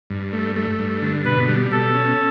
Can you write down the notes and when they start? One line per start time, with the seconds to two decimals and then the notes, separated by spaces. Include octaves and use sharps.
0.10 G2
0.33 A3
0.56 A3
0.79 G2
1.02 D3
1.25 B2 B4
1.48 G3
1.71 B2 A4
1.94 C#4